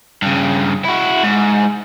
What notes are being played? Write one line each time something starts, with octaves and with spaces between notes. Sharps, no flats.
G2 C#3
E4 F#4
G#2